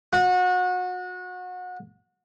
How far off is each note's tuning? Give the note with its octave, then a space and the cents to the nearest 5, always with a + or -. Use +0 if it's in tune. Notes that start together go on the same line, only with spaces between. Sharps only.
F#4 -30